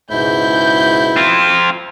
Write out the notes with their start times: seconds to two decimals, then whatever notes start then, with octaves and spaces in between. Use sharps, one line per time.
0.11 C#2 G#2 B2 E4 G6
1.16 C4 F4